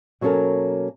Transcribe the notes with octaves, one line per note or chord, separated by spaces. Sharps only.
B2 F#3 A#3 C#4 A4 A#4